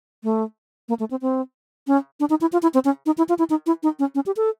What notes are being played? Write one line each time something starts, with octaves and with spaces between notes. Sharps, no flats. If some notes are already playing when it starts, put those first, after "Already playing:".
A3
A#3
A3
C4
C4
C#4
D4
D#4
E4
F4
E4
C4
C#4
D#4
E4
F4
E4
D#4
E4
D#4
C#4
C#4
G4
A4